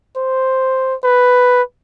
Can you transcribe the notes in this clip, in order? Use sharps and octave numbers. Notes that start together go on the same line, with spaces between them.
C5
B4